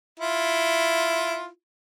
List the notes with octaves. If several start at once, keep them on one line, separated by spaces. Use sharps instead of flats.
E4 F4